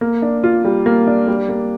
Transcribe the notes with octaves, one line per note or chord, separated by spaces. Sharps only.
A#3
D4
F4
G3
A#3
D4
G3
A#3